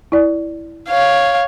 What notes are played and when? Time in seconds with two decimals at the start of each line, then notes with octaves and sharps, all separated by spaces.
0.12 E4 D5
0.89 C#5 F5